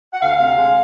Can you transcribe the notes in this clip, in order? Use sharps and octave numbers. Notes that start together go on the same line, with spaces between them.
F#5
D2 F5
C3
G#3